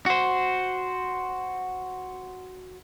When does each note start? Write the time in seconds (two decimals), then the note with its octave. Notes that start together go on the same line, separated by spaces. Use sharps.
0.06 F#4 C5